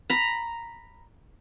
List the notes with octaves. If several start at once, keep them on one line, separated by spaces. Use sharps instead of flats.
A#5 B5